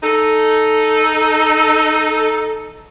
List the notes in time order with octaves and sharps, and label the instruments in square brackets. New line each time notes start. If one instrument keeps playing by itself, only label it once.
[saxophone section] D#4 A4